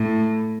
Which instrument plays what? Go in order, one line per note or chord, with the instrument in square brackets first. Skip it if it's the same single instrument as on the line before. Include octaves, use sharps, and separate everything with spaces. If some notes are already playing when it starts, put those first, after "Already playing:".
Already playing: [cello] A2